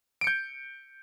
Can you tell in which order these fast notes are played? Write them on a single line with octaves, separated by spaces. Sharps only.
D7 C#7 G6